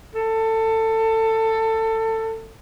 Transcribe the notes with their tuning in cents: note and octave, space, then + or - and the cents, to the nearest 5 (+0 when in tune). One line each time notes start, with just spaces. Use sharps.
A4 +20